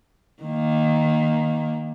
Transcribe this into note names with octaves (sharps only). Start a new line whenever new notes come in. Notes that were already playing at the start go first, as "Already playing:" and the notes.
D#3 A#3